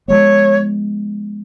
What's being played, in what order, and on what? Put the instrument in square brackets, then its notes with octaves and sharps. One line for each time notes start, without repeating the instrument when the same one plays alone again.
[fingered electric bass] F3 G#3 B3 [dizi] C#5